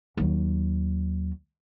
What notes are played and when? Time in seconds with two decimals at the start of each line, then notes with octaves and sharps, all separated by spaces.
0.17 D#2 F#3